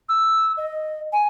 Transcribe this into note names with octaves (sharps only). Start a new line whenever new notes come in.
E6
D#5
G#5